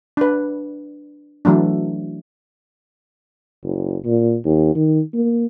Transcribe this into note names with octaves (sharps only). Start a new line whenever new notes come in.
D4 B4
E3 F#3 A3 D4
F#1
A#2
D#2
D#3
A#3